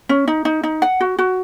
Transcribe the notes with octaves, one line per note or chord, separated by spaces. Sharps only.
C#4
D#4
D#4
D#4
F#5
F#4
F#4